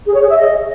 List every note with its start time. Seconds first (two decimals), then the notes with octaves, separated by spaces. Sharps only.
0.06 G#4
0.14 C#5
0.21 G#4
0.29 E5
0.37 D#5